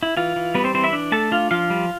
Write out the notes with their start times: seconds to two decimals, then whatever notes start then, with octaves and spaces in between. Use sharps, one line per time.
0.03 E4
0.17 E3 F4
0.36 E3
0.54 G3 B3 B4
0.64 C4 C5
0.74 E3 C4 C5
0.84 E4 E5
0.93 D4
1.12 A3 A4 A5
1.31 D4 F4 F5
1.51 F3 F4 F5
1.70 G3